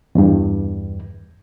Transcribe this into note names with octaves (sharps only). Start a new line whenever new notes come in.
E2 G2